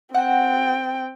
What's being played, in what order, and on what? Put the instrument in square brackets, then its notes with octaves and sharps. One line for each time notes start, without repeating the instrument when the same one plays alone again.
[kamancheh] C4 G5 [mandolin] F#4 F#5